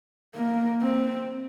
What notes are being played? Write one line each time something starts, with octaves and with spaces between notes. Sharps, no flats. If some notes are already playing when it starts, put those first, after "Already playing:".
A#3
C4